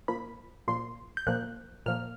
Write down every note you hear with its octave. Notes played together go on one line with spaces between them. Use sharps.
A#2 F3 A#3 B5
A#2 F3 A#3 C6
G6
A#2 F3 A#3 F#6
A#2 F3 A#3 F6